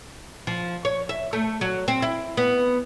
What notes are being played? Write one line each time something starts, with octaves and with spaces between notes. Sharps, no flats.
F3
C#5
E5
A3
F#3
C4
E4
B3